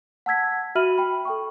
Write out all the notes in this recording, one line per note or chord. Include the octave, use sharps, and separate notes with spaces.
F#5 A5 E6 G#6 B6
F#4 E5 B5 F6 D#7 F#7
G5 B5
A4 G5 C#6